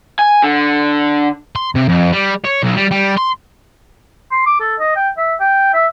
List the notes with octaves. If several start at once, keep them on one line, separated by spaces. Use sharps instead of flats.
G#5
D3
C6
C3
F2
G3
C#5
B1
G3
G3
C6
C6
D6
A4
D#5
G5
E5
G5
E5